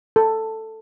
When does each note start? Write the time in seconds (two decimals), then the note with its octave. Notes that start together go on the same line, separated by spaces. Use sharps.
0.16 A4